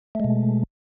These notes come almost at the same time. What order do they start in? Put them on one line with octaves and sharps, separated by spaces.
A3 G#3 B2